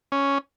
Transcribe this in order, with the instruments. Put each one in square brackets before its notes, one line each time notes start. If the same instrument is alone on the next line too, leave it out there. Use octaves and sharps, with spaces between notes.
[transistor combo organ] C#4